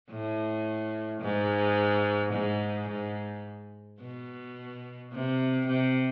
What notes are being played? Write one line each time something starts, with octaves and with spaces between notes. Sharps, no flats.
A2
G#2
G#2
G#2
B2
C3
C3